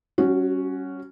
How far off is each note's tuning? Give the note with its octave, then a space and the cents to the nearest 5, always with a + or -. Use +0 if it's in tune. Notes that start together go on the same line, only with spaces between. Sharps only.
G3 -35 C#4 +0 F#4 +0